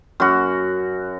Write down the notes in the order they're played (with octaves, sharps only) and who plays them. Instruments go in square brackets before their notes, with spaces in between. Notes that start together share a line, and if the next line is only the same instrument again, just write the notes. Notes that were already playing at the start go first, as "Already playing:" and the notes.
[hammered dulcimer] F#2 F#4